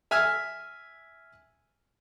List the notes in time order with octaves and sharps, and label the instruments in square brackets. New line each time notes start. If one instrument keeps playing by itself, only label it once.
[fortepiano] E5 G#5 E6 F6